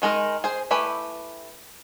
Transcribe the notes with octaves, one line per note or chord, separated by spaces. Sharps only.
D#3 G#3 D#4 A#4
G#4 C5
A3 E4 G4 B4 G#5